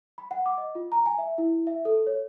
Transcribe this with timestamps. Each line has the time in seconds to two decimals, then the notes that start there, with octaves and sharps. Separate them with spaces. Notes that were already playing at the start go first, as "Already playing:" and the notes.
0.18 B5
0.31 F#5
0.46 D6
0.58 D#5
0.75 F4
0.92 A#5
1.06 G#5
1.18 E5
1.38 E4
1.67 E5
1.85 A4
2.07 C#5